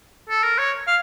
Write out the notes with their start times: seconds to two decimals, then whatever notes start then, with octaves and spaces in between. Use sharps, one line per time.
0.30 A4
0.43 A#4
0.58 C#5
0.87 F5